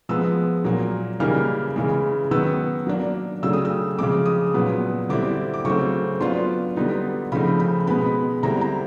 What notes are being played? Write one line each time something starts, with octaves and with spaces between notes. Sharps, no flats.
F3 G#3 B3 E6
A#2 F#3 A#3
C#3 E3 G3 A#3 D#4 F6
C#3 E3 G#3
D#3 F#3 B3 E6
F#3 A#3 D4
C#3 F#3 A3 E6
D#6
E6
C#3 F3 G#3 D6
D#6
A#2 F#3 B3
D3 G3 C4 E4 D6
D6
C#3 F#3 A3 C4 C#6
F#3 B3 D4 F4 C6
D3 G3 B3 D#4
C#3 F3 A3 C4 D#4 B5
B5
B2 G#3 B3 B5
D3 G3 C4 E4 A#5
A#5